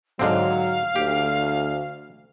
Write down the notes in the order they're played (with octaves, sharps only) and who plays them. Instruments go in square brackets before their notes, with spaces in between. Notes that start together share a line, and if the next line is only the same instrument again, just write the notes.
[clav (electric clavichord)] G#2 D3 C4 [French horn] F#3 [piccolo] F5
[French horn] D2 [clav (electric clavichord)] G4